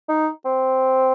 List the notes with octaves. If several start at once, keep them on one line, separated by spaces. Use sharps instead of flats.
D#4
C4